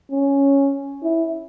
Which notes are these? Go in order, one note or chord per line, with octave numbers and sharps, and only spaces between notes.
C#4
E4